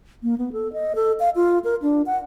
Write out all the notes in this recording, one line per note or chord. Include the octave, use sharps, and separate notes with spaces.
A#3
B3
A4
D#5
A4
F5
F4
A#4
D4
F#5